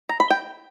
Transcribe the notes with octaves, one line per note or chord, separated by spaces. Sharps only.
A#5
B5
G5